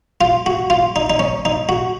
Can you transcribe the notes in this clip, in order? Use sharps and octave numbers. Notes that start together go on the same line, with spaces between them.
F4
F#4
F4
D#4
D#4
C#4
D#4
F#4